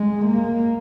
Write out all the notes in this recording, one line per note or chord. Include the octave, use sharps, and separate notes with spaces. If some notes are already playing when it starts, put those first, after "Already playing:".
Already playing: G#3
A#3